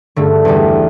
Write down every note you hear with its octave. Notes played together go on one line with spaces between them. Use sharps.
G2 D3 A3
E2 D3 G3